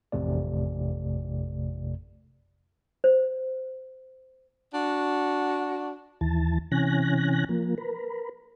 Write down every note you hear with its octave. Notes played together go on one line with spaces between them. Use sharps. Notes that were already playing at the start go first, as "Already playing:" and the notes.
A1 F2 C3 A3 D5
C5
D4 F#4
D#2 E3 A5
C3 E3 C#4 G#5 F#6 A#6
F3 A#3
A#4 B4